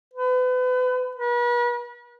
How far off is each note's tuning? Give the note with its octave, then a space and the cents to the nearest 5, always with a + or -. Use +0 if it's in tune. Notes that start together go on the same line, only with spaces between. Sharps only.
B4 +35
B4 -40